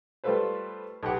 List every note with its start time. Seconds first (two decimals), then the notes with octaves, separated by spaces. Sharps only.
0.24 G3 A3 F4 A4 B4 C5
1.03 B1 G4 F#5